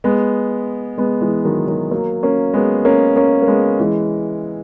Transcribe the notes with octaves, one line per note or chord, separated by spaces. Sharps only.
G#3 B3
G#3 B3
E3 G#3
D#3 F#3
D#3 F#3
F#3 A#3
A#3 C#4
G#3 B3
A#3 C#4
A#3 C#4
A#3
G#3 B3
E3 G#3